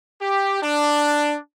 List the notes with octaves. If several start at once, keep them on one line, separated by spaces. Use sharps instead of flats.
G4
D4